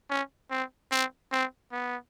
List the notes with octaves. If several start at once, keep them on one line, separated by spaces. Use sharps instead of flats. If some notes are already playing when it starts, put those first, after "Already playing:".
C#4
C4
C4
C4
B3